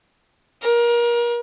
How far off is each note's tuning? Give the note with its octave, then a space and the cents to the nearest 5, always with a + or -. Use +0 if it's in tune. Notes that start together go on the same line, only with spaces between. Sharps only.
A#4 +30